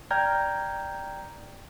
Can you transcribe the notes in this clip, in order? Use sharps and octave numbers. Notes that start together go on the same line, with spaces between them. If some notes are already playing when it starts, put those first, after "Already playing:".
D5 G5 A#5 F6 G6 G#6